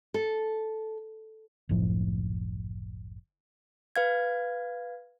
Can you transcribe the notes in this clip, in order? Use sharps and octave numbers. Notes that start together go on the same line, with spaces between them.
A4
F#1 C2 A2 F3
B4 F5 G#6